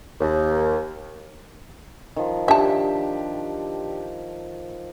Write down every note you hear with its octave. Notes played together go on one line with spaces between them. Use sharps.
D#2
D#3 F3
D4 G4 E5 A5